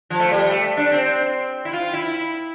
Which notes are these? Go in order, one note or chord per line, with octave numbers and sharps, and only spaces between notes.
F3
A3
G3
A3
D4
C4
E4
F4
E4